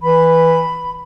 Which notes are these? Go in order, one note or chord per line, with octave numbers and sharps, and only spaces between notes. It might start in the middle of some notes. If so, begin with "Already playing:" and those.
E3 B5